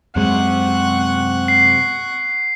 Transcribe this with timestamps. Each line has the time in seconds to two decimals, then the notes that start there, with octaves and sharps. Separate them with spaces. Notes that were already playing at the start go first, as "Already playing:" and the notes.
0.16 F#2 C3 G#3 F#5 C#6
1.48 C7